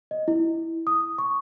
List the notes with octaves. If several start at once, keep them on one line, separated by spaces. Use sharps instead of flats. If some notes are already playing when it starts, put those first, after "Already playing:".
D#5
E4
D#6
C#6